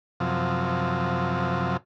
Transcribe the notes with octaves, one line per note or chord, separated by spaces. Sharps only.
F#2 C3 F3